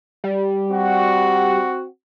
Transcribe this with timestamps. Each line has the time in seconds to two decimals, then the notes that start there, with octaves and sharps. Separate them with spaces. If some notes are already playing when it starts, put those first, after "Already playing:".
0.24 G3
0.70 C4 F#4